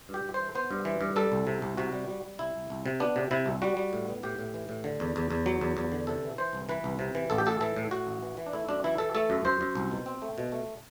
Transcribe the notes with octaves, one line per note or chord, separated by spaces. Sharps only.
G2
G4
G2
E3 C5
B3 C5
G2
E3
G2
G3 A4
C2
C3
C2
C3 F#4
G3
G3
G3
C2 E4
C2
C2
C3
B3 D4
C3
C3 E4
C2
G3 F#4
G3
A2
B3
A2 G4
A2
E3
A2
D3
E2
E2
E2
F#3
E2
E2
D3
C3 A4
E3
E3 C5
C2
E3 B4
C2
C3
E3
A1 A4
G4
A2 A4
E3 A4
A2
A2 F#4
A1
E3
E3
D4
A3 E4
F#2 D4
E3 E4
E3 A4
A3 A4
F#2
F#2 C5
F#2
C2
B2
C4
A3
B2
A3